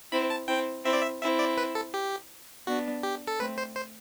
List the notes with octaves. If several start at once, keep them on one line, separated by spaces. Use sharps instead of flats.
C4 E4 B5
A5
C4 E4 G5
C4 E4 E5
D5
E5
C4 E4 E5
D5
B4
A4
G4
B3 D4 F#4
G4
A4
A3 C4 B4
C5
C5